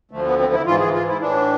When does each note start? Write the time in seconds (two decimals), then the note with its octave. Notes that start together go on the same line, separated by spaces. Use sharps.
0.11 D2 D3 F3 A3
0.25 B3
0.39 C4
0.53 E4
0.66 G#2 E3 F4
0.80 G#4
0.94 F4
1.08 E4
1.21 A2 E3 D4